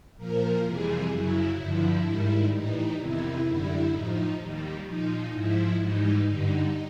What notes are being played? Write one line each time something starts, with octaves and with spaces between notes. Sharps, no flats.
A#2 F3 A#4
F2 C3 E3 G3 G#4
F#2 C#3 F#3 E4
G2 D3 F3
G#2 D#3 G3
A2 E3 G3 D#4
E2 C3 D#3 E4
F#2 D3 G3 E4
A2 F3 D#4
D#2 D#3 G3
A#2 F3 D#4
G#2 F3 E4
G#2 E3 G3 D#4
G2 D3 G3 D#4